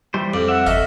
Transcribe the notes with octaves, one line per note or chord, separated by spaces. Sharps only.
E3 G3 C5
F2 D5
E5 F#5
G1 F#4 A4 D#5 E5 F6